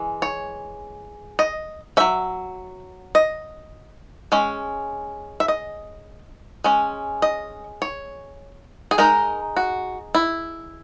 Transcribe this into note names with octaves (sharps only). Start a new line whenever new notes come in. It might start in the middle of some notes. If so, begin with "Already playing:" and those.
Already playing: E3 G#3
C#5
D#5
F#3 C#4 E5
D#5
G#3 C#4
E5
D#5
G#3 C#4
D#5
C#5
G#4
G#3 D#4 A#4
F#4
E4